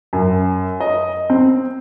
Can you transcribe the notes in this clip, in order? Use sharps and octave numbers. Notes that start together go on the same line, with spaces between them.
F#2
D#5
C4